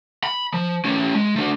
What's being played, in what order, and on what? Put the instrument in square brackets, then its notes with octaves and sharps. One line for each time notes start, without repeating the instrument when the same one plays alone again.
[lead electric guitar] B5
F3
A3 C#4
G#3
A3 D4